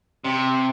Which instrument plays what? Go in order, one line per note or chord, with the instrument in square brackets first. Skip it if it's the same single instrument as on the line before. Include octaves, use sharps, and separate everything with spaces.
[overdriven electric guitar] C3